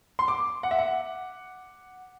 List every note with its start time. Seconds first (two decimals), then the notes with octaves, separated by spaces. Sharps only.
0.19 C6
0.28 D6
0.63 F#5
0.71 E5
0.79 F#5